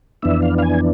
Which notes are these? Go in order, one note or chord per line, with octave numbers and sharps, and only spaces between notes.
F2 E3 B3 D4 E5
F5
F5
G#5